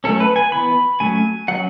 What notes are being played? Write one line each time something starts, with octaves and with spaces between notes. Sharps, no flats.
F#3 A3 C#4 A4
B4
G#5
E3 B3 B5
F#3 A3 C#4 G#5
F#3 C#4 F#5